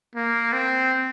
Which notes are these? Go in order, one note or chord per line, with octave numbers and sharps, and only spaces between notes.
A#3
C4